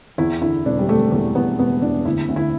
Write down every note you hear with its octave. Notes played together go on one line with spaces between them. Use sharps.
E2 E4
D3 E4
E1 D4
G3
E1 A3
E2 A3
E2 B3
E1 B3
E2 D4
D2 E4
D2
E4